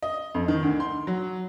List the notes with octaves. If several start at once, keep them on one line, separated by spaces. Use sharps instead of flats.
D#5
F2
D#3
D2
C6
F#3